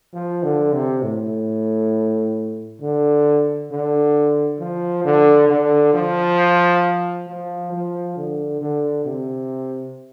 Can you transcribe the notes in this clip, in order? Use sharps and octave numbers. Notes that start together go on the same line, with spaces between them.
F3
D3
C3
A2
D3
D3
F3
D3
D3
F3
F3
F3
D3
D3
C3